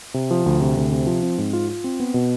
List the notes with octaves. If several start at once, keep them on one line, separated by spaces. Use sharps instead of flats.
C3
F3
D2
C3
D2
C3
F3
C4
G#2
F4
F4
C4
B3
B2